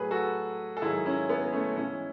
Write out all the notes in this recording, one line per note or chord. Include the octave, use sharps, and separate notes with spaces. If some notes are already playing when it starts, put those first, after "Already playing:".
Already playing: A2 F#3 G#4 B4
F#4 A4
A4
G#2 D#3 F#3 E4 G#4
C#4 E4
B3
A3 C#4
G#2 E3 C#4 E4